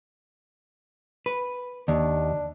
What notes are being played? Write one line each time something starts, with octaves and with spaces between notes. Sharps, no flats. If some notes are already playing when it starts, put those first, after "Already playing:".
B4
D#2 D4